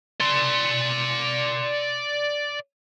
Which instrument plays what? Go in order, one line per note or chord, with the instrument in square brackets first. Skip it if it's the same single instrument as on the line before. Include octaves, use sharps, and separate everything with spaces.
[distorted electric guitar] D5 C6